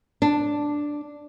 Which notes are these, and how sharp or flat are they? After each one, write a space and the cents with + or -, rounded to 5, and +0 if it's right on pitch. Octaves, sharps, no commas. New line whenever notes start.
D4 +0